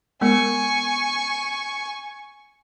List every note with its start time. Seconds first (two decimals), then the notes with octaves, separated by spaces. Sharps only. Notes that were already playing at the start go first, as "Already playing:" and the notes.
0.21 G#3 B3 A#4 G#5 C#6